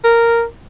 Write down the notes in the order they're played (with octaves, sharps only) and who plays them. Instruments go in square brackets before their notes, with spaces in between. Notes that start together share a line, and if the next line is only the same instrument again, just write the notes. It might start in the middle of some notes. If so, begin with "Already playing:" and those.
[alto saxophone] A#4